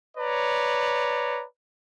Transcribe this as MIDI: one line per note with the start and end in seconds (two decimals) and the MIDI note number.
0.17 1.44 71
0.17 1.44 73
0.17 1.44 74
0.17 1.44 82